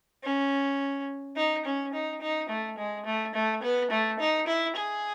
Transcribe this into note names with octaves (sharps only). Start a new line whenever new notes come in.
C#4
D#4
C#4
D#4
D#4
A3
G#3
A3
A3
B3
A3
D#4
E4
G#4